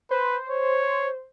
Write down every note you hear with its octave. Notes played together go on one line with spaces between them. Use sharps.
B4 C5
C#5